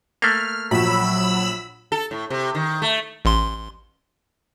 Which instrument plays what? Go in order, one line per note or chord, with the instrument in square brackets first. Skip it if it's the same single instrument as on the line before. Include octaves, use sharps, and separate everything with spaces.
[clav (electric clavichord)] A3 A#3 [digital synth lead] F6
[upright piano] A#1 [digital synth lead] F#3 [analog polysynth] B5 E6
[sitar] A4
A2
C3
D#3
A3
[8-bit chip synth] A1 C6